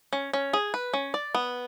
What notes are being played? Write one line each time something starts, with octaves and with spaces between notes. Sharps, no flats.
C#4
C#4
G#4
B4
C#4
D5
B3